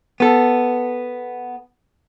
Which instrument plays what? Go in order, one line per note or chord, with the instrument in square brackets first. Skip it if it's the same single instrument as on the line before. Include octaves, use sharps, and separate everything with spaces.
[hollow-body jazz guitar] B3 A4